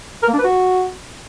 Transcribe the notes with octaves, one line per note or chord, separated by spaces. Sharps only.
A#4
A#3
D4
B4
F#4